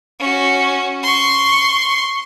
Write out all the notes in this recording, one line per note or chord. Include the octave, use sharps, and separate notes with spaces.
C#4 F#4
C6 C#6